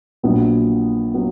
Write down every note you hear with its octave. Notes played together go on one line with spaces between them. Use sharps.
A#1 A#2 F#3 B3
F#3 B3